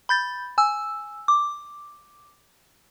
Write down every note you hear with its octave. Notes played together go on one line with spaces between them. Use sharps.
B5 G6 A6
G#5 E6
D6